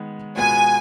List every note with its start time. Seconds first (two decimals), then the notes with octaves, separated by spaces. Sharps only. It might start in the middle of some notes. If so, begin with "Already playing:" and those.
Already playing: D#3 G#3 B3
0.37 B2 G#3 B3 F4 G#5